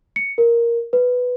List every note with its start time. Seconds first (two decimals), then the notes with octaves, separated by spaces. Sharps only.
0.16 C#7
0.38 A#4
0.93 B4